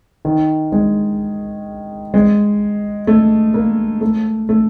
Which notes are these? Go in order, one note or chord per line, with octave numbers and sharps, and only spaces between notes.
D#3
G#3
G#3
A3
A#3
A3
A3